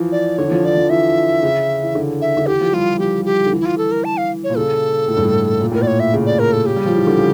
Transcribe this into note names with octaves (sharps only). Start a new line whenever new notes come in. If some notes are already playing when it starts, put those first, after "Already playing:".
Already playing: E3 F3
D5
D3 C#5
E3
F3
E3 D5
F3
E3 E5
C#3
E3
D3
E5
D3
E3 G4
F3
G3 F4
F3 G4
G4
D3
E3
E4
F4
A4
A#4
A5
F5
C#5
A#2
C#3 A4
A2
G2
A2
A#2
A2 A#4
A#2 D5
C#5
E5
C#3
D5
A#4
A4
G4
G3
F3
E3
D3
C#3